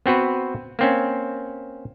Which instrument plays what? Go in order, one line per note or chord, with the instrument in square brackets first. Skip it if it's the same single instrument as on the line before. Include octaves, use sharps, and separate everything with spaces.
[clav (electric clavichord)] B3 C4 F#4 B4
A#3 C4 C#4